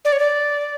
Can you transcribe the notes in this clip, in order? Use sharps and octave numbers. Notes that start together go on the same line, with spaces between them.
D5
C#5
D5